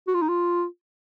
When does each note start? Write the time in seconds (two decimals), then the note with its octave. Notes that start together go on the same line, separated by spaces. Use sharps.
0.08 F#4
0.15 F4
0.22 D#4
0.29 F4